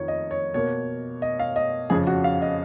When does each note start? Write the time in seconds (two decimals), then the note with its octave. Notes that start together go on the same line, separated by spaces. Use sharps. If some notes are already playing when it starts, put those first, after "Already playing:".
Already playing: F2 D#3 C#5
0.08 D#5
0.31 C#5
0.54 B2 A#3 C#5
1.22 D#5
1.39 F5
1.56 D#5
1.90 F2 C#3 F3 G#4
2.07 F#4
2.24 F5
2.42 D#5